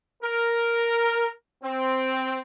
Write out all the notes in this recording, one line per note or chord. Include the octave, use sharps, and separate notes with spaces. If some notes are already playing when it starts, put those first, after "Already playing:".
A#4
C4